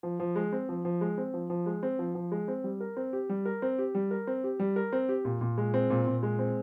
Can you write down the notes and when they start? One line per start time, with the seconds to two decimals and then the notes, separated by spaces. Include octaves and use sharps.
0.03 F3
0.20 F3
0.36 G#3
0.53 C4
0.69 F3
0.85 F3
1.01 G#3
1.18 C4
1.34 F3
1.50 F3
1.66 G#3
1.83 C4
1.99 F3
2.15 F3
2.32 G#3
2.48 C4
2.64 G3
2.81 A#4
2.97 C4
3.13 G4
3.29 G3
3.45 A#4
3.62 C4
3.78 G4
3.95 G3
4.11 A#4
4.27 C4
4.44 G4
4.60 G3
4.76 A#4
4.93 C4
5.09 G4
5.25 A#2
5.41 A#2
5.58 G#3
5.74 C4
5.90 A#2
6.07 A#2
6.23 G#3
6.39 C4